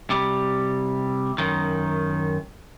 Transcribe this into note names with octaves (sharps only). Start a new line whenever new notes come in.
C3 G3
F#2 D#3